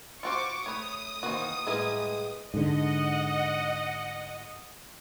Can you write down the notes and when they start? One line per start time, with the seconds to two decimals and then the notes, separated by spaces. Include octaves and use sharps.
0.23 F4 F#4 C5 C#6 D6
0.66 A3 B4 C#5 D#6
1.23 D#3 E3 A#3 F#4 C5
1.66 A2 E3 G3 G#3 A#3 E4 B4
2.54 G#2 D3 D#5 F#5